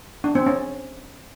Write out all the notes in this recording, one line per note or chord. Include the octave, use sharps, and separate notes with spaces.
D4
C4
C#4